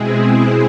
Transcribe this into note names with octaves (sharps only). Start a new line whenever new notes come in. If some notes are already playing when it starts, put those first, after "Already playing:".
Already playing: B2 G#3 C4 E4 G#4